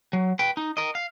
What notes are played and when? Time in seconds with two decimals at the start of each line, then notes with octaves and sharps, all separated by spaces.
0.13 F#3
0.39 B4 G5
0.57 D#4
0.77 A#4 D#5
0.95 F5